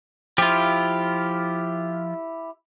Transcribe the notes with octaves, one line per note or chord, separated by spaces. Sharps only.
F3 E4 F4 G4